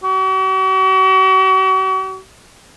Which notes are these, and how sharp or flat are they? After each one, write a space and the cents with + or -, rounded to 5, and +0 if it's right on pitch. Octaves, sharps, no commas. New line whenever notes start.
F#4 +45